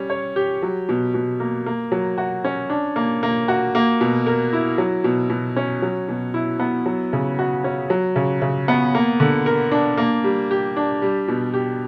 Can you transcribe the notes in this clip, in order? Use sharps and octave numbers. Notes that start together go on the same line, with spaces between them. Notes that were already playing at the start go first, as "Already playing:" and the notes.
Already playing: G3 C#4
C#5
G4
F#3
B2
B2
A#3
A#3
F#3
F#4
C#4
D4
A#3
A#3
F#4
A#3
B2
A#4
E4
F#3
B2
B2
C#4
F#3
B2
E4
B3
F#3
C#3
F#4
C#4
F#3
C#3
C#3
B3
A#3
D3
A#4
D4
A#3
G3
G4
D4
G3
B2
G4